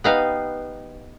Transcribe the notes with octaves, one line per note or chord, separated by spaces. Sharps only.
B3 D#4 G4 B4 F5 G5